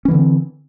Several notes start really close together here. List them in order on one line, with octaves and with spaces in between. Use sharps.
C#4 E3 D3 C4